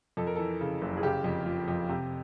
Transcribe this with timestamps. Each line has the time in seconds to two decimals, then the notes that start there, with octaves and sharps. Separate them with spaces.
0.17 F2 A4
0.27 A#4
0.36 E3 A4
0.61 C#3
0.81 F#1
0.97 G#4
1.03 C#3 G4
1.24 F2
1.46 F3
1.68 F2
1.89 C3 G4